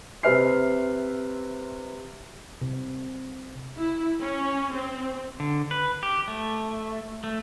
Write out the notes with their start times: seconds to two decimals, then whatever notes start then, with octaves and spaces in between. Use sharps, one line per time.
0.23 C3 C4 B4 E5 F6 C7
2.61 C3
3.77 E4
4.20 C#4
4.73 C4
5.40 D3
5.71 B4
6.03 G4
6.28 A3
7.24 A3